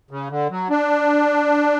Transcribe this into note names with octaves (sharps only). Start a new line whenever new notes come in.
C#3
D3
F#3
D4